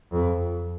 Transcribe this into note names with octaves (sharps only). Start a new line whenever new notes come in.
F2